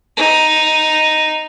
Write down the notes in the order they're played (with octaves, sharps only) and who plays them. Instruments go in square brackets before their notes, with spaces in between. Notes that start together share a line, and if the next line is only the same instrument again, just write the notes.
[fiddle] D#4